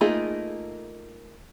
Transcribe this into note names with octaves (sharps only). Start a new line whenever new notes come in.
A3 A#3 D#4 F4 G#4